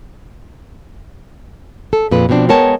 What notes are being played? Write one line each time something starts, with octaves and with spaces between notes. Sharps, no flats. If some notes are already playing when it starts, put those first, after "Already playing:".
A4
F2 A#2 G#3 B4
B2 F3 C4 D4
G#3 B3 A#4 C#5 G5 A5